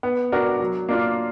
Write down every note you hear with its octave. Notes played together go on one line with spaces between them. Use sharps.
B3
D4 F#4 A#4
F#3
A#3 D4 F4